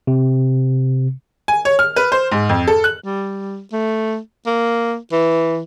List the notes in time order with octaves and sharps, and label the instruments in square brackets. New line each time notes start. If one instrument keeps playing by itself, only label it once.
[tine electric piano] C3
[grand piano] G#5
C#5
F6
B4
C5
G#2
F2
A4
F#6
[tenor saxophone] G3
A3
A#3
E3